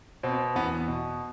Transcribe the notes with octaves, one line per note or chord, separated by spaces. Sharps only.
B2 C4
E2 B3
B2